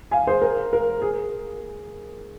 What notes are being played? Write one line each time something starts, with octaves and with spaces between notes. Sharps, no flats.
F5 G#5
G#4 C5
A#4
A#4
G#4